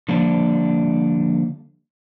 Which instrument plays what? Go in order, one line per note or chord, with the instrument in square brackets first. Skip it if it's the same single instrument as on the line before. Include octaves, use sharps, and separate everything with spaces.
[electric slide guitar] D3 F3 G3 A#3 D4